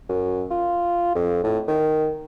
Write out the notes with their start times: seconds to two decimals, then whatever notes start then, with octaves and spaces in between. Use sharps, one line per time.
0.09 F#2
0.51 F4
1.15 F2
1.44 A2
1.68 D#3